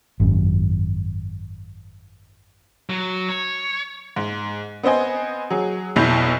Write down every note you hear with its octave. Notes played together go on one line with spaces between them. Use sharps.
G#1 F#2
F#3
C#5
G#2
B3 C4 C5 D#5 G#5
F#3 G#4
F1 B1 B2 E4 G6 F7